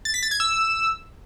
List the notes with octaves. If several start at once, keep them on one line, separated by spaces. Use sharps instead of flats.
A6
B6
A6
G#6
E6